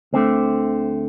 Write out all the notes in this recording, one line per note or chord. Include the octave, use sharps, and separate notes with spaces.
D2 D3 A3 C4